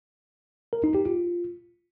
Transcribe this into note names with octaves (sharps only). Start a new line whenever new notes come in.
A#4
D#4
G4
F4